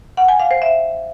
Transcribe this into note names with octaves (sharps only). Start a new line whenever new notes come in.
F#5
G#5
F5
C5
E5